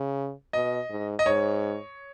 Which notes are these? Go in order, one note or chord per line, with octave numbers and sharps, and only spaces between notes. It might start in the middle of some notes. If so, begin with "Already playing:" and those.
Already playing: C#3
B2 D#5
G#2
D#5
G#2 C#5